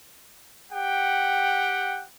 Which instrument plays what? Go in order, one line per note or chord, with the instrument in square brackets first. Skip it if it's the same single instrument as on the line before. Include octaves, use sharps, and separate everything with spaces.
[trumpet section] G4 F#5 G5